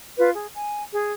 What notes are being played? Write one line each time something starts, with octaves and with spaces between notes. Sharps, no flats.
F4 B4
G#4
G#5
G#4